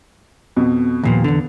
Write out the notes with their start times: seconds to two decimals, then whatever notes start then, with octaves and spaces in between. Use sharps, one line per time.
0.57 F2 B2
1.03 D#2 A#2 F3 B3
1.24 E2 D3